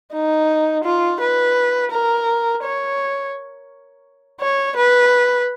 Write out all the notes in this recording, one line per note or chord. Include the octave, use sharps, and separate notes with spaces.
D#4
F4
B4
A#4
C#5
C#5
B4